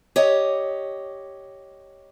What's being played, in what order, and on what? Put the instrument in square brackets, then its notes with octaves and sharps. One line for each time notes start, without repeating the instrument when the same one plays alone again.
[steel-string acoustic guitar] G4 C#5 D#5